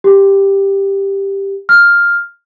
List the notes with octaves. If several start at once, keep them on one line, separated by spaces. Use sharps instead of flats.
G4
F6